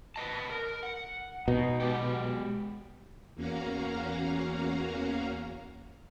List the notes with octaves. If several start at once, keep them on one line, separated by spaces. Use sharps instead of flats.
B4 D#5 A5
A#4
F#5
B2 D#4
G#3 G4 G5
E2 A#3 C#4 F#4 F5 A#5